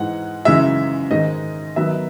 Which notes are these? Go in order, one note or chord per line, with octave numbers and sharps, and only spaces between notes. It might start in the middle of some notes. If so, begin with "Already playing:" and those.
Already playing: G#2 E3 G#3 D#4 F#5
F#2 C#3 E3 G#3 D#4 E5
G#2 D#3 G#3 D#4 D#5
D#3 F#3 B3 D#4 E5